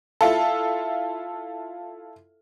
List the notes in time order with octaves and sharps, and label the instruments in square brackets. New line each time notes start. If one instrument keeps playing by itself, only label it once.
[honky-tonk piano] E4 F4 A4